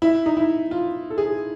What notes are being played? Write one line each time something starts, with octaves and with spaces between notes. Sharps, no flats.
E4
D#4
E4
F4
A4
G#4